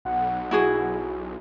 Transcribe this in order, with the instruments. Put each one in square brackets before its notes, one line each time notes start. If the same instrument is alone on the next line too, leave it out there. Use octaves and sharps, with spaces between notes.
[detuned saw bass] B1 [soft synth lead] F#5
[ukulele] E4 F#4 G#4